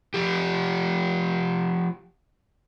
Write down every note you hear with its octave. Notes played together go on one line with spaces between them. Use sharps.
F3 G4